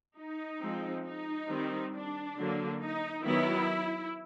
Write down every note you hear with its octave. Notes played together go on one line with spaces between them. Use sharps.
D#4
F3 G#3 C4
D#4
D#3 G3 C4
D4
D3 F#3 A#3
D#4
D#3 F#3 B3 E4